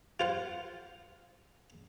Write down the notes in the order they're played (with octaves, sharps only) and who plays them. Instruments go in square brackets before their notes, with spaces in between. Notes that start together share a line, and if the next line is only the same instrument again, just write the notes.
[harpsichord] F4 C5 F#5